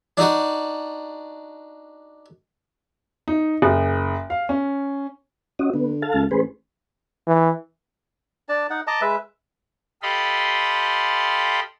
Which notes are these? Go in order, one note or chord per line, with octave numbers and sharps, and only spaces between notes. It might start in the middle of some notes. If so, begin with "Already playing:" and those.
D4 D#4 F#4
D#4
F#1
F5
C#4
C#4 F#4 D#5
D3 B3
A4 F5 A5
C#2
A1 G#4 B4 C5
E3
D4 D5 A5
D#4 F#5
D#5 A5 A#5 D6
G#3 B4 E5
G4 A4 D#5 F5 B5 C6